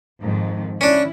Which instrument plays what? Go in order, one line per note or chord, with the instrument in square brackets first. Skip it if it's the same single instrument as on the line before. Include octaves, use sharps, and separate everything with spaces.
[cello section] F2 G#2 D#3
[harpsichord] C#4 D4 [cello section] E4